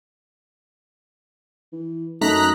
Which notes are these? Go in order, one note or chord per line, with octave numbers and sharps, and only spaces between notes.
E3
F#2 A3 D#4 A#5 F#6 B6